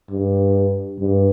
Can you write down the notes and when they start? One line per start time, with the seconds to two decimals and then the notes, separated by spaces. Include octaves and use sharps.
0.11 G2
0.99 G2